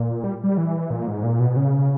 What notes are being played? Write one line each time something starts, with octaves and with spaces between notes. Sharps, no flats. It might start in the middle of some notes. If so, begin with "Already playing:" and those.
Already playing: A#2
G3
G3
E3
A#2
G#2
A#2
B2
C#3